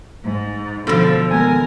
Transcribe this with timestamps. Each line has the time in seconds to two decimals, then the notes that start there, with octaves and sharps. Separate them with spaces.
0.24 G#2
0.87 B2 D3 F3 A4
1.31 D#3 G#3 B3 A#4 G#5